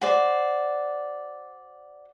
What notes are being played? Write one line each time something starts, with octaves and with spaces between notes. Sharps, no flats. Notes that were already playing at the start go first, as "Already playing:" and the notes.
F#4 C5 D5